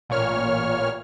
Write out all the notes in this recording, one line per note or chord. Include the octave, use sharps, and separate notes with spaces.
A1 A#2 C#5 F6